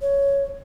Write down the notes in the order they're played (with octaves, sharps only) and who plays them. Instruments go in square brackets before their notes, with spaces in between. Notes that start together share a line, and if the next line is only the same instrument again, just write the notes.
[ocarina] C#5